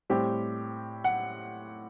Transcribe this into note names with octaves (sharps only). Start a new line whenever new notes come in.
A2 G3 C4 G4
F#5